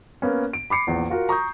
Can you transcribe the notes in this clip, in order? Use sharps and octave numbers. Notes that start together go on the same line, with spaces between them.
A#3 B3 C#4
D7
B5 D6 C7 C#7
A#1 E2
F4 F#4 A#4
A#5 C#6 D#6 G6